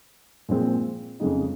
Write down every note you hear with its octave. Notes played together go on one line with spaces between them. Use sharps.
A#2 F3 G#3 C4
F2 C#3 G#3 D#4